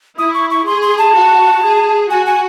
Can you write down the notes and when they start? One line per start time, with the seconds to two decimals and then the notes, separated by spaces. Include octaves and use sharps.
0.18 E4 D#6
0.34 C#6
0.50 C#6
0.67 G#4 C6
0.82 C6
0.98 A5
1.14 F#4
1.63 G#4
2.10 F#4 G#5
2.26 G#5